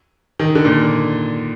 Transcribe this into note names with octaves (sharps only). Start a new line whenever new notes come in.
D#3
D3
A#2